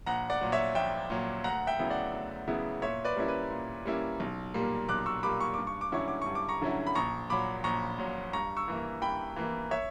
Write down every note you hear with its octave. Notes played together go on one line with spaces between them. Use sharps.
A#1 F#5 A#5
D5 F#5
A#2 F#3
C#5 E5
A#1 E5 G5
A#2 F#3
D2 F#5 A#5
E5 G5
C#3 F#3 B3 E4
D5 F#5
D2
C#3 F#3 B3 E4
A#2 C#5 E5
B4 D5
G3 A#3 C#4 E4
B4
A#2
G3 A#3 C#4 E4
B1
A#2 G3 A#3
B1 D6 F#6
C#6 E6
A#2 G3 A#3 B5 D6
C#6
G2 D6
C#6
D6
D3 F#3 C#4 E4 C#6
D6
G2 C#6
D6
A#5 C#6
D3 F#3 C#4 E4
B5
A#1 A#5 C#6
A#2 F#3 B5 D6
A#1 A#5 C#6
A#2 F#3
G2 A#5 C#6
C#6 E6
E3 A#3 E4
G2 G5 B5
E3 A#3 E4
C#5 E5